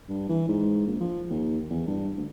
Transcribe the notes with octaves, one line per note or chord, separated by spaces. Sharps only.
G2
E3
G#2
A#1
F3
D#2
E2
G2
D2